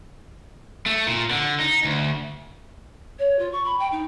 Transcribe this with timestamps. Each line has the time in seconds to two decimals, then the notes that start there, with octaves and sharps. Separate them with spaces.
0.86 A3
1.07 A#2
1.31 D3
1.60 D#4
1.85 D2
3.19 C#5
3.39 F4
3.52 C#6
3.65 B5
3.79 G5
3.92 D#4